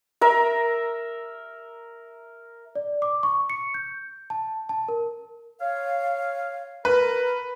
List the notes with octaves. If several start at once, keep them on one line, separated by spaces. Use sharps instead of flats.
A#4 E5
D5
D6
C#6
C#7
G6
A5
A5
A#4
C#5 F5
A#4 B4